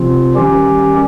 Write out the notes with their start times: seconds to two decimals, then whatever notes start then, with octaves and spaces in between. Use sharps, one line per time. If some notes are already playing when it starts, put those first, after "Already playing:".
Already playing: C3 F3 C4 F4
0.35 D#3 G3 C#4 G4